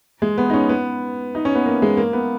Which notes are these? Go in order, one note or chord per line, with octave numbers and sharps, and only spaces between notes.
G#3
B3
D#4
C#4
B3
D#4
C#4
B3
A#3
G#3
A#3
B3